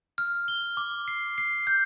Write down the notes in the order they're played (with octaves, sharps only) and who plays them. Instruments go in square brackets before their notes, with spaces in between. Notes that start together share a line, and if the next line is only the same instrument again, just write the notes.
[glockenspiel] F6
G7
D6
C7
C7
G6